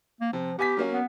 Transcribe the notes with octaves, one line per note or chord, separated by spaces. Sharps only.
A#3
C3 F3
B3 G4 G#5 B6
F#3 A#3 C#4
B3